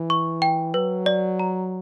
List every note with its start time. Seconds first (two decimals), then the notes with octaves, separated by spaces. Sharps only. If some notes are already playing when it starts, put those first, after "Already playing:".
Already playing: E3
0.10 C#6
0.42 G5
0.74 F#3 B4
1.06 D5
1.39 A#5